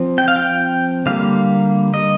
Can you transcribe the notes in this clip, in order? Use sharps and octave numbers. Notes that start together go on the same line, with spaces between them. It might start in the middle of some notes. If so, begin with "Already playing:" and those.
Already playing: F3 C4
G5
F5
G5
D3 G3 A#3 F5
D#5